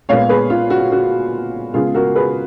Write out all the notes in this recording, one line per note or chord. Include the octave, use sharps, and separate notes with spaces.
A#2 G#3 B3 C#5 F5
G#4 B4
F4
F#4
F#4
C#3 G#3 B3 F4 G#4
F#4 A#4
G#4 B4